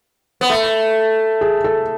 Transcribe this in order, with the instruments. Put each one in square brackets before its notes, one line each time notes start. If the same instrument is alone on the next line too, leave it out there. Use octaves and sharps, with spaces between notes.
[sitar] B3
A3
[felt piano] G#4
A4